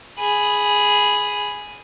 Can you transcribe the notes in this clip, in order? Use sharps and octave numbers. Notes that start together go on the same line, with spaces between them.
G#4 B5